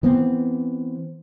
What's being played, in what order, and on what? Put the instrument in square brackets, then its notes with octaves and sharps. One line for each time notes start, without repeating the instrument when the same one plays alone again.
[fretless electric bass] E3 B3 C4